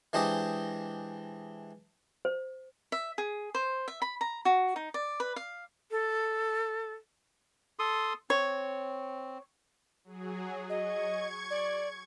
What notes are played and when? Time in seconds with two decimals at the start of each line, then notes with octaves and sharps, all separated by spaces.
0.13 E3 G#3 D4 G4 C5 D#5
2.25 C5
2.92 E5
3.18 G#4
3.55 C5
3.88 E5
4.02 B5
4.21 A#5
4.45 F#4
4.76 D#4
4.94 D5
5.20 B4
5.36 F5
5.91 A4
7.79 A4 C6 D#6
8.30 C4 C#5
10.04 F#3 G#4
10.69 D#5 C#6 G#6
11.50 D5